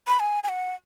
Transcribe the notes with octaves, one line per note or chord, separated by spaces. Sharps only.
B5
G#5
G#5
F#5